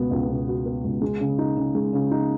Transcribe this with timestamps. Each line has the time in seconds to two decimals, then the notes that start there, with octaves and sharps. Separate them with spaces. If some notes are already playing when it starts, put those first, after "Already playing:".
Already playing: C#2 B2 B3 F#4
0.11 C#2
0.29 B2
0.48 F#4
0.66 B3
0.84 C#2
1.02 G#3
1.20 C#3
1.38 D#4
1.57 C#3
1.75 G#3
1.93 C#3
2.11 D#4